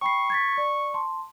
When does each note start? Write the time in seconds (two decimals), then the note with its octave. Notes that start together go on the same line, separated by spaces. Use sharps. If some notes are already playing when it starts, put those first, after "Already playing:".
0.02 G5 B5 C#6 C7
0.30 G#6 A6 B6
0.58 D5
0.94 A5 C6